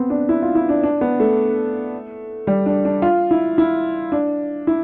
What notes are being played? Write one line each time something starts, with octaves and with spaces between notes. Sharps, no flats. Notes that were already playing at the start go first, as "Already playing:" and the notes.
Already playing: B3 C4
D4
E4
F4
E4
D4
D4
B3
A3
G3
D4
D4
F4
E4
E4
D4
E4